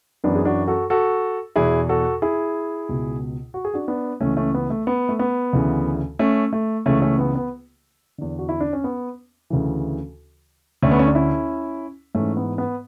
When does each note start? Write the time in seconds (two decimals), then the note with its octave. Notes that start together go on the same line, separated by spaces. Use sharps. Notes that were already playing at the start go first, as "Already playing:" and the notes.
0.24 F#2 E3 B3 D4
0.35 G#4
0.45 D4 F#4
0.68 F#4 A4
0.90 F#4 A4
1.56 E2 B2 E4 G#4
1.89 F#4 A4
2.22 E4 G#4
2.89 C#2 B2
3.54 F#4
3.65 G#4
3.74 D4 F#4
3.88 B3 D4
4.20 C#2 C#3 E3 A3 C#4
4.37 A3 C#4
4.54 B3
4.70 A3
4.87 B3
5.09 A3
5.19 B3
5.53 D2 C#3 E3
6.19 A3 C#4
6.53 A3
6.86 C#2 C#3 E3 A3 C#4
7.02 A3 C#4
7.19 B3
7.35 B3
8.18 E2 D3
8.38 F#4
8.49 E4
8.60 D4
8.73 C#4
8.84 B3
9.50 D2 C#3 E3
10.82 D2 D3 A3 C#4
10.91 B3
10.99 C#4
11.07 D4
11.15 C#4 E4
12.15 G#2 E3 A3 C#4
12.37 B3
12.58 B3